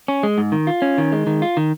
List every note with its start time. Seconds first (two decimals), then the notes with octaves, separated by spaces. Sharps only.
0.08 C#4
0.23 G#3
0.38 G#2
0.52 D#3
0.67 F4
0.82 C#4
0.98 D#3
1.12 G#3
1.27 D#3
1.42 F4
1.57 D#3